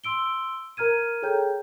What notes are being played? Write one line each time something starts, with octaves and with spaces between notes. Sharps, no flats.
C6 E6 D7 G7
A#4 A#5 F6 G#6 D#7
G#4 A4 C#5 G5 A#5 G6